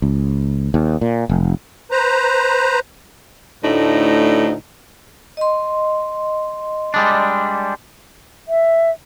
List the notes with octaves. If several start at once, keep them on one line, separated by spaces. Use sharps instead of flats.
C#2
D#2
A#2
F1
B4 C5 A#5
D2 A2 D4 D#4
D#5 C6
G3 G#3 D4
E5